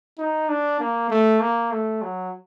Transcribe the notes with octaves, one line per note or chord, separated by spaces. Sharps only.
D#4
D4
A#3
A3
A#3
A3
F#3